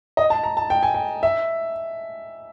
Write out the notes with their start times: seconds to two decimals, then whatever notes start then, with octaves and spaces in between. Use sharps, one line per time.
0.17 D#5
0.30 A5
0.43 A#5
0.57 A5
0.70 G5
0.83 G#5
0.94 G5
1.23 E5